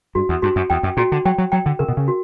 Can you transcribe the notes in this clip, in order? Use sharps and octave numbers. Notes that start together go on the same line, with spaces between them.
G2 F#4
E2
G2 F#4
F#2
E2 G5
F#2
A#2 F#4
D3
F#3 G5
F#3
F#3 G5
D3
C#3 A#4
B2
C#3
F#4